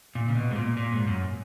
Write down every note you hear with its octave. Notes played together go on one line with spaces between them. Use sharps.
A#2
C#3
B2
G#2
A#2
A#2
G#2
F#2